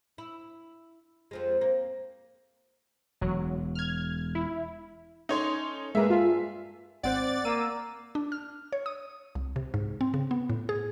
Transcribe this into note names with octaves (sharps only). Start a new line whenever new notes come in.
E4
F2 F3 G#3
A#3
E1 F#3
F6 G#6
E4
C#4 D#4 A4 C#5 C6
G2 G#3 A#3 G#4 B4 E5
F4
G#1 C4 C5 D5 F#5 A6
A#3 E6 D#7
D4
F6
C#5
D#6
C2
C3
G#2
C4
C#3
B3
A2
G#4